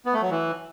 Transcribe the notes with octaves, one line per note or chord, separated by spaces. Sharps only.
B3
A3
F#3
E3